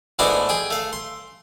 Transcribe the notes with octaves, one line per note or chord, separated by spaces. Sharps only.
G#2 A3 B3 D4 E4 F#4
G#4 G5
A3 F5
C6